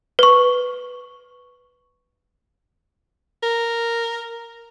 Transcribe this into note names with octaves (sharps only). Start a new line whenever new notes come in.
B4 C#6
A#4